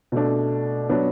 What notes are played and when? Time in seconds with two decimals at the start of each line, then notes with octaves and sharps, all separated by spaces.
0.12 B2 A3 D4
0.89 F#3 B3 D4